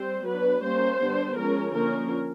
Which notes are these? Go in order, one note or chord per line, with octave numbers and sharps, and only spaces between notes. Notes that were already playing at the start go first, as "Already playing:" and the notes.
Already playing: G3 C4 C5
F#3 B3 D4 B4
G3 A#3 C#4 C5
D3 G3 B3 D4
F3 G#3 C#4 A#4
D3 F3 A#3 C#4 A#4